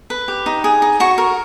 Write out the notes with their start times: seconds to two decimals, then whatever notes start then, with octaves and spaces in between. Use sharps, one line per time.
0.10 B4
0.28 G4
0.46 D#4
0.64 G#4
0.82 D#4
1.00 F#4 C#6
1.18 A#4